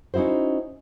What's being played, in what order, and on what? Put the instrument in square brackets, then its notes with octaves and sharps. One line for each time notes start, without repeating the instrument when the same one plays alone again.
[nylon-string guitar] C#4 D#4 E4 F#4 C5